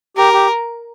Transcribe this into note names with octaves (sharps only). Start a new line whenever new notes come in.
G4 A#4
G4